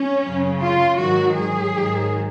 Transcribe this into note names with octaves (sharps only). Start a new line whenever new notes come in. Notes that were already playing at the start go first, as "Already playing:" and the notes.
Already playing: C#4
F#2 C#3 F#3
F4
G#2 D#3 F#3 F#4
G#4
G#2 D#3 F#3